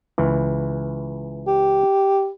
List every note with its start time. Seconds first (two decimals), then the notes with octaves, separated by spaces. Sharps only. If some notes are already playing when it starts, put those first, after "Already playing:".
0.18 C#2 E3
1.47 G4